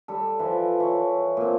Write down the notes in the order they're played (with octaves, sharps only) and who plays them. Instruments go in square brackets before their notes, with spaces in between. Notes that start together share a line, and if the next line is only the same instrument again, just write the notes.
[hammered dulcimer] G3 A4
E3 F3
E3 C#5
A#2 C4